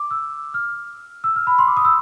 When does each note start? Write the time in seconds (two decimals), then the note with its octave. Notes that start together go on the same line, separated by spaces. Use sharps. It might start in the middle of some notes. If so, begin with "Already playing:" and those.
Already playing: D6
0.11 E6
0.54 F6
1.24 E6
1.36 F6
1.47 B5
1.59 C6
1.67 D6
1.77 D#6
1.85 E6